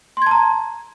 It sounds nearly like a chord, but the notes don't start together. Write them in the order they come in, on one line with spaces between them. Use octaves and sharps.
C6 G#6 A5 A#5